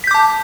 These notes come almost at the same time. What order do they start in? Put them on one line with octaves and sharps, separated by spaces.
B6 G6 D6 A5